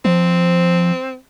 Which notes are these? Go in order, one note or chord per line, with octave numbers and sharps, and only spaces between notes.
F3 C4